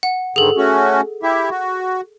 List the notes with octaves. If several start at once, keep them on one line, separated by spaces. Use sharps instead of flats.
F#5
G#2 D3 D#3 G#4 A4
A3 C#4 F#4
E4 G4 E5
F#4